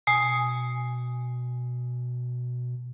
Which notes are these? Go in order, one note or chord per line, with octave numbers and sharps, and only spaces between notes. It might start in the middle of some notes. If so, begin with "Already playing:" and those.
B2 G#5 D#6 C7